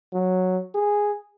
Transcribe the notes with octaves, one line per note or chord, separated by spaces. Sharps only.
F#3
G#4